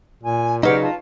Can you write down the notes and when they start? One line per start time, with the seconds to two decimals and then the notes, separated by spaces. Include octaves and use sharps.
0.23 A#2 G#5
0.63 C#3 F#3 D#4 G4 B4 F#5 F6
0.81 F4 A5